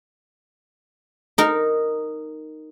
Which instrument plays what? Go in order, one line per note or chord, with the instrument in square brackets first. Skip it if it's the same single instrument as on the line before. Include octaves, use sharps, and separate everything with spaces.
[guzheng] D#4 A#4